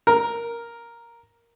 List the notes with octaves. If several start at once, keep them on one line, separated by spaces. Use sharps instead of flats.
A#4